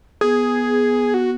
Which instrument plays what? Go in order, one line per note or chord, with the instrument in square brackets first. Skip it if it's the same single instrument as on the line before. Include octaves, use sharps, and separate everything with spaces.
[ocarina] B3 [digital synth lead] G#4
[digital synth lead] F#4